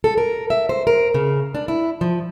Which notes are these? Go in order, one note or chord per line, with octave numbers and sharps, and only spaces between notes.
A4
A#4
E5
C5
A#4
C#3
D4
E4
F3